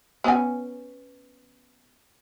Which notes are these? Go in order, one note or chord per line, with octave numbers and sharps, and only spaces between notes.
B3 C#4 G#5